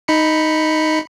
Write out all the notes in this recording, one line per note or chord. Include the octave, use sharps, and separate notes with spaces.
D#4 B5 C#7